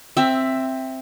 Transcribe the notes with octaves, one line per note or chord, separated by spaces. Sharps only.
C4 E5